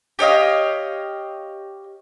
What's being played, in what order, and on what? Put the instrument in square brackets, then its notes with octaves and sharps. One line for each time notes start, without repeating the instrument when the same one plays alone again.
[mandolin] G4 C#5 D#5 F5